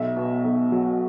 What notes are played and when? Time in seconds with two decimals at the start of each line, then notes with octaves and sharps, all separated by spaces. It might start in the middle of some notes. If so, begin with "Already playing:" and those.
Already playing: B1 E5
0.17 B2
0.44 B1
0.72 F#3